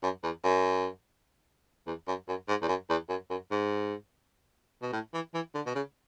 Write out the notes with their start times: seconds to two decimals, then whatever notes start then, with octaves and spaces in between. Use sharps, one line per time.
0.03 F#2
0.24 E2
0.44 F#2
1.87 E2
2.08 F#2
2.28 F#2
2.48 G#2
2.62 E2
2.68 F#2
2.90 E2
3.09 F#2
3.30 F#2
3.51 G#2
4.82 B2
4.93 A2
5.14 E3
5.34 E3
5.55 D3
5.66 B2
5.75 C#3